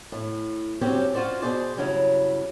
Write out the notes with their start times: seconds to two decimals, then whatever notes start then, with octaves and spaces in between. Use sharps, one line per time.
0.12 A2
0.81 G2 C#3 F#3 C4 C#4 G4
1.14 C#4 F4 F#4 C5 D5
1.42 B2 G#4 C5 D5
1.77 G2 C#3 F#3 C#4 E4